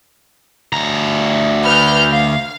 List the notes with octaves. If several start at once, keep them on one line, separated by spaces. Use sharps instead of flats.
D2 A#5
B4 F6 G6
F5